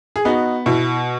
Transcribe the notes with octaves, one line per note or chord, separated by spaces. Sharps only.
G#4
B3 D#4 F#4
B2 E4